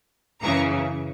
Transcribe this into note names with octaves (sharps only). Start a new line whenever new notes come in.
F#2 C#3 E3 A#5 C#6